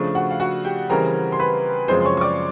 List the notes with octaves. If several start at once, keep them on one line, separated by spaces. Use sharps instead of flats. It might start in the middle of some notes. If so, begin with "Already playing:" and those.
Already playing: C#3 F3 A3 D4
F#4 F#5
F5
F#4 F#5
G4 G5
C#3 E3 G3 C4 A#4 A#5
C6
B4 B5
F#2 C#3 F3 G#3 C4 C5 C6
C6
C#5 C#6
C#6
D5 D6